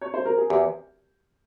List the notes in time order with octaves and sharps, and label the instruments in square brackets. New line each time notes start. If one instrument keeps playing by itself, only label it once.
[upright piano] C#5
C5
A#4
G#4
[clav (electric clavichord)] E2 [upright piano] G4